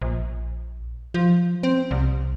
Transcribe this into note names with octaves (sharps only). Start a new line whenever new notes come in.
A#1
F3
C4
C2